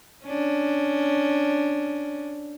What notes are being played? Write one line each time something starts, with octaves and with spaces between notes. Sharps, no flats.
C#4 D4